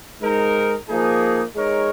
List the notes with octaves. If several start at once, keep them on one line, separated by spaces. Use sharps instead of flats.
G#2 G#3 D#4 A#4
F3 A#3 D#4 G#4
G#3 D#4 A#4 C#5